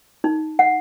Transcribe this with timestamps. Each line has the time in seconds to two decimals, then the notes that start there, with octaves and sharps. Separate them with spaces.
0.24 D#4
0.59 F#5